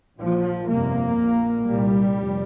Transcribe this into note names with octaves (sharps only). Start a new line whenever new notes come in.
A#1 A#2 F3
G1 F2 C3 A#3
A#1 A#2
C2 A#2 G3
F1